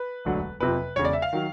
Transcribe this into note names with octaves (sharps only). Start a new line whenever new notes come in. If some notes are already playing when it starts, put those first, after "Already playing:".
Already playing: B4
E1 D2 D3 F#3
F#1 F2 C3 F3 B4
E1 E2 C#3 C#5
D5
E5
F5
D#3 F#3